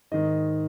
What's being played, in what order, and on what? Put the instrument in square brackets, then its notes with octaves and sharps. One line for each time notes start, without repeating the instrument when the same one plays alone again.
[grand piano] G#2 D#3 D#5